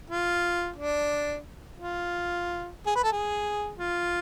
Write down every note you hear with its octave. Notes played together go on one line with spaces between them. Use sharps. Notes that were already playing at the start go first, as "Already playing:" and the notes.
F4
D4
F4
G#4
B4
A4
G#4
F4